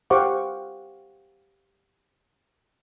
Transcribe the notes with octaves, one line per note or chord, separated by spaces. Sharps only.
G4 C5 F5 F#5 C#6 D6